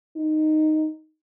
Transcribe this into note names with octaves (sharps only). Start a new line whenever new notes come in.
D#4